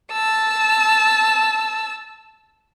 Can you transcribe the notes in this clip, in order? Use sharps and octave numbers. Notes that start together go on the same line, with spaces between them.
A5 E6